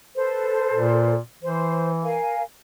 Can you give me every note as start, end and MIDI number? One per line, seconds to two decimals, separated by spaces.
0.16 1.14 69
0.16 1.14 71
0.16 1.14 72
0.73 1.17 46
1.43 2.18 52
1.43 1.89 72
2.03 2.42 70
2.03 2.42 77
2.03 2.42 80